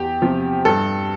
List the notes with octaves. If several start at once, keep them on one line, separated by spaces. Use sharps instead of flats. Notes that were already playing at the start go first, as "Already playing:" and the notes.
Already playing: E2 G4
C3 F3
G2 A4